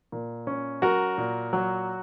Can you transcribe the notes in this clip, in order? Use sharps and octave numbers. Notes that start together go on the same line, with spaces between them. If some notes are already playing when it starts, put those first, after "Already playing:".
A#2
C#4
F#3 F#4 A#4
A#2
F#3